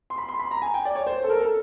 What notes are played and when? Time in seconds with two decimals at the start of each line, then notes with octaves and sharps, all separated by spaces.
0.10 C6
0.18 B5
0.29 C6
0.39 B5
0.51 A#5
0.62 G#5
0.74 G5
0.85 D5
0.95 C#5
1.07 C5
1.24 A4
1.30 A#4
1.40 A4